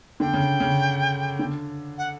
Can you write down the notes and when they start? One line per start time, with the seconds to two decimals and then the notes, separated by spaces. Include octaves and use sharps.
0.20 D3 G5
0.33 C#3
0.60 C#3
1.39 D3
1.98 F#5